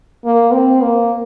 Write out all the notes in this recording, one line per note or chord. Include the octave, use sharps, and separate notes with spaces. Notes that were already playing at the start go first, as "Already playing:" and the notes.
A#3
C4
A#3